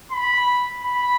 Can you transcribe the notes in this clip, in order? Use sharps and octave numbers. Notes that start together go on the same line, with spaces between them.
B5
B5